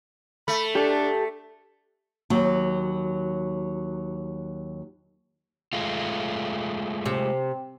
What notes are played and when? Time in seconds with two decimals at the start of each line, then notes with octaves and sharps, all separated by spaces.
0.48 A3 B5
0.75 D4 G4 A4
2.30 D#2 F#3
5.73 G#3 A3 F4
7.06 C3